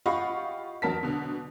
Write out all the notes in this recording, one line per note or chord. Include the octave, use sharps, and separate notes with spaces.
F4 G4 D#5 F#5 B5 C#6
E2 F#3 A#4 A5 B6
B2 D3